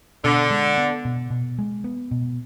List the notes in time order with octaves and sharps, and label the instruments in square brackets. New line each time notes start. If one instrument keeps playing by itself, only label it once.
[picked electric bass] B2 [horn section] D3
[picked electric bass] G#3
B3
B2
B2
G#3
B3
B2